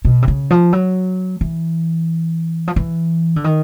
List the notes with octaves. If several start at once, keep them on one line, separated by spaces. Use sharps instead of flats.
B2
C3
C#3
F3
F#3
E3
F3
E3
D3
D#3